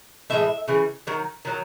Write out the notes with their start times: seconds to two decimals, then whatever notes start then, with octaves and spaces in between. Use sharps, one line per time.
0.30 A2 E3 G#3 E5
0.68 C#3 E3
1.07 D#3 F#3
1.45 D#3 F#3